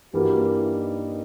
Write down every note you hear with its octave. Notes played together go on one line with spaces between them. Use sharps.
G2 E3 G3 A#3 F#4
E4
D#4